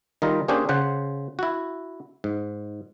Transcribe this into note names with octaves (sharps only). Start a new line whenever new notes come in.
D#3 G3 D#4 F4 A#5
A#3 C#4 D4 G4 G#4 C5
C#3 C5 F#5
E4 F#4
G#2